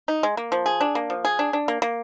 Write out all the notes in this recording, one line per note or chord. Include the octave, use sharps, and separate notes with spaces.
D#4
G#3
A#3
F3
G#4
D4
A#3
F3
G#4
D4
D4
A#3
A#3